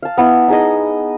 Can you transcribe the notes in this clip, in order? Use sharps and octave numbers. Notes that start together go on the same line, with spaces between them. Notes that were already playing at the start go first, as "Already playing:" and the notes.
F5 A5
B3 E4
D#4 G#4 D#5